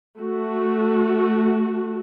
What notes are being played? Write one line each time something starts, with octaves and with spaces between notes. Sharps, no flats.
A3 F#4